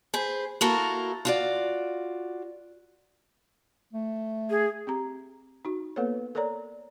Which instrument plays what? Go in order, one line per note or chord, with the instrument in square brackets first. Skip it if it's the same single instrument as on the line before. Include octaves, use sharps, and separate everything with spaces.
[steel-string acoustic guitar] G#4 B4 C5
A#3 E4 F#4 A4 A#4
F4 F#4 D5
[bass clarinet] A3
[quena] G#4
[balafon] C4 G4 A#5
D#4 F#4
A#3 B3 A4 B4 C#5
A4 A#4 C#5 D5 A#5